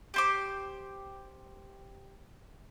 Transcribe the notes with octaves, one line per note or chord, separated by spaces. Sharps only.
G4 C5 D6